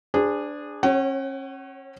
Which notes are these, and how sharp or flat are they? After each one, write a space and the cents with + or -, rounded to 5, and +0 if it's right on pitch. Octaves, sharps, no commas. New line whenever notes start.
D4 +0 G#4 -15 C5 -40
C#4 -35 C#5 -5 F#5 +35